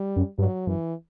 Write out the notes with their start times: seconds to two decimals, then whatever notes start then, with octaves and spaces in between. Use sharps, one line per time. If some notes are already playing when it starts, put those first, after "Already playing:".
Already playing: G3
0.16 F#2
0.38 G2 F#3
0.67 F#2 E3